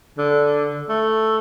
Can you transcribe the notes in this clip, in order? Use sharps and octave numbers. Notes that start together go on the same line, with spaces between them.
D3
A3